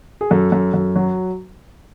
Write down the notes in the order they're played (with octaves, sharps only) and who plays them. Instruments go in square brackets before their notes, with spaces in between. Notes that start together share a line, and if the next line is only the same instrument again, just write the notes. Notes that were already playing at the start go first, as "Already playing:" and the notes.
[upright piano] G#4
F#2 A4
F#2
F#2
F#3